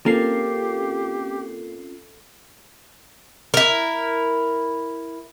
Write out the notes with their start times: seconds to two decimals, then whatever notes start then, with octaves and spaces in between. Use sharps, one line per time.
0.06 A#3 C4 C#4 F4 G4 A4 C7
3.54 E4 A#4